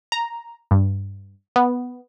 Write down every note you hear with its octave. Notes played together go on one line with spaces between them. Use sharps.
A#5
G2
B3